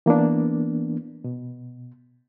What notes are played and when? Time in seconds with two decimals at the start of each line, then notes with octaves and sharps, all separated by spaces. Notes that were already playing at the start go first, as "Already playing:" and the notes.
0.06 E3 A#3 B3 D4
1.24 B2